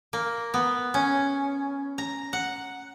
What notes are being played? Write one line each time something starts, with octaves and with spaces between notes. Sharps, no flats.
A#3
B3
C#4
A#5
F#5